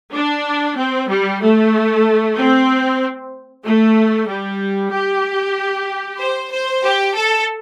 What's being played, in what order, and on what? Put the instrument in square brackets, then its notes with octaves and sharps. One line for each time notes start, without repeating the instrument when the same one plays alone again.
[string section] D4
C4
G3
A3
C4
A3
G3
G4
C5
C5
G4
A4